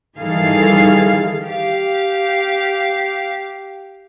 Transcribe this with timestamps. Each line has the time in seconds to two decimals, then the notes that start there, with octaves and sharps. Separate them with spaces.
0.18 D#3 E3 G3 G#4 A4 F5
1.46 G4 F5